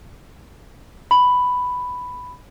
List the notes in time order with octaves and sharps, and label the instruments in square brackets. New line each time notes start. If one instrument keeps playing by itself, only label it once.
[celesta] B5